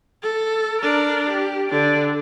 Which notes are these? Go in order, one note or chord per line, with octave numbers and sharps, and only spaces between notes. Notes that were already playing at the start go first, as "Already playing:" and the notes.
A4
D4 A#4
G4
D3 D4